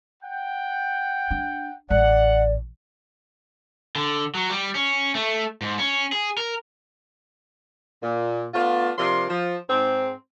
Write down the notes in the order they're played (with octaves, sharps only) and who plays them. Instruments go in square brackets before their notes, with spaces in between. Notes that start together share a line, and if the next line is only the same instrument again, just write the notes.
[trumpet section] F#5 G5
[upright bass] D4
[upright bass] A1 [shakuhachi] D5 [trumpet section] F#5
[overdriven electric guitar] D3
F#3
G3
C#4
A3
G#2
C#4
G#4
A#4
[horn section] A#2
A3 B3 D4 F4
C3 F3 D4 A#4 C6
F3
G#2 C4